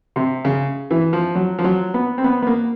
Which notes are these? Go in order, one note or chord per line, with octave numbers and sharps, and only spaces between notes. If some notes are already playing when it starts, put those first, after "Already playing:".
C3
C#3
E3
F3
F#3
F3
F#3
B3
C4
B3
B3
A#3